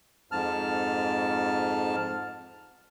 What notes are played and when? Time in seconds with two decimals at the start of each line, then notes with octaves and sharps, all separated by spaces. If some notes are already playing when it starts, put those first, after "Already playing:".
0.32 F2 G#2 A5 F6